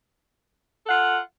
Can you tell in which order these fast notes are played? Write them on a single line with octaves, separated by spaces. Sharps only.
A4 F#5 F4